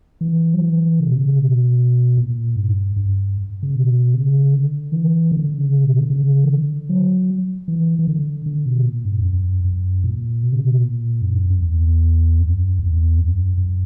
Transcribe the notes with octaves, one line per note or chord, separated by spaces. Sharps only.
E3
F#3
E3
C#3
B2
C#3
B2
A#2
G2
G2
C#3
B2
C#3
D3
E3
D3
C#3
B2
D3
C#3
E3
D3
F#3
E3
E3
D3
D3
B2
A#2
G2
E2
F#2
F#2
A#2
B2
C#3
B2
A#2
F#2
F#2
E2
F#2
E2
F#2
F#2